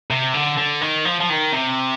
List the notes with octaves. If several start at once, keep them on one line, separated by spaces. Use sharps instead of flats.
C3
D3
D3
D#3
F3
F3
D#3
C3